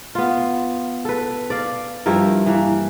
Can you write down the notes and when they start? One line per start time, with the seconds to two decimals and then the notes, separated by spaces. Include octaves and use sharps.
0.15 B3 F4
1.05 A4 B4
1.50 D5 F5
2.06 G2 F3 E4 A#4
2.46 E3 A#3